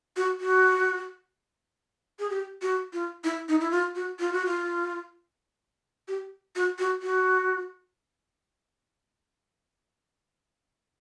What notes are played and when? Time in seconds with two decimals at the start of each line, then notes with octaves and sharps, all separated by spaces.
0.17 F#4
0.40 F#4
2.19 G#4
2.30 G4
2.62 F#4
2.93 F4
3.24 E4
3.49 D#4
3.60 E4
3.71 F4
3.95 F#4
4.20 F4
4.33 F#4
4.46 F4
6.08 G4
6.56 F#4
6.79 F#4
7.02 F#4